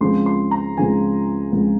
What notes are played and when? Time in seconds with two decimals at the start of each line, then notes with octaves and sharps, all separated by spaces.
0.01 C#2 C#3 F3 C4 C6
0.26 C6
0.51 A#5
0.77 C#2 C#3 F3 C4 G#5
1.52 C#2 C#3 F3 C4